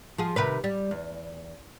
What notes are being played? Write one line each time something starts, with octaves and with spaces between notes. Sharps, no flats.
F3 G#4
C3 D#3 B4
G3
E2